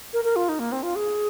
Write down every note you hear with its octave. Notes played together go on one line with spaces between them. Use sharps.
A#4
A#4
F4
D#4
A#3
C4
F4
G#4